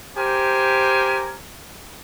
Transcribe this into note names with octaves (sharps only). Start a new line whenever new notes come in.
G4 A#4 C5 G#5